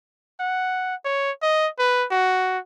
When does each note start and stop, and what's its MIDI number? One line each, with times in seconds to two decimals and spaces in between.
0.40 0.95 78
1.05 1.31 73
1.42 1.67 75
1.79 2.05 71
2.11 2.58 66